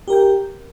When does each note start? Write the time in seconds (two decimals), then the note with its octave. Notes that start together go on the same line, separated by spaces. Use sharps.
0.08 G4
0.10 A#4
0.13 G5